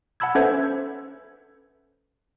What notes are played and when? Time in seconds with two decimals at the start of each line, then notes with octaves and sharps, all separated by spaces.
0.20 F#5 A5 B5 E6 G#6
0.35 C#4 A4 B4 C5 E5 G#6